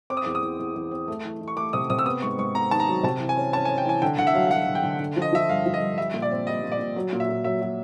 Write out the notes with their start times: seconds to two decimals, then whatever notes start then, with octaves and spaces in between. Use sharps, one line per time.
0.10 C4 D6
0.17 D#6
0.24 E2 D6
0.35 D#6
0.42 E2
0.59 E2
0.76 E2
0.91 C4
1.08 A3
1.25 E3
1.41 E3
1.48 C#6
1.57 A3 D6
1.73 C3 D#6
1.90 C3 D#6
1.99 E6
2.06 B3 D#6
2.22 G#2 C#6
2.39 G#2 C#6
2.54 B3 A#5
2.71 D#3 A5
2.80 A#5
2.88 F#3
3.03 C3 A5
3.20 E3
3.29 G#5
3.37 C#4
3.53 C#4 A5
3.65 G#5
3.69 C#4
3.78 G5
3.85 E3 G#5
4.02 D3 G5
4.18 D3 F#5
4.27 E5
4.34 F#3 F5
4.47 F5
4.51 F#3 F#5
4.67 D3
4.75 G5
4.83 D3
5.00 D3
5.17 F3
5.22 D#5
5.33 F3 E5
5.49 G2 F5
5.66 F3
5.74 D#5
5.82 G2
5.98 G3 E5
6.14 A#2
6.22 D5
6.31 C4
6.47 G3 D#5
6.63 A#2
6.72 D5
6.79 A#2
6.96 F#3
7.13 A#2
7.20 E5
7.29 A#2
7.44 F#3 E5
7.62 F#3